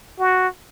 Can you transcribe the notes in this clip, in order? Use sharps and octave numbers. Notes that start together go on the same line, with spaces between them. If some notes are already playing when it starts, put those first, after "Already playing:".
F#4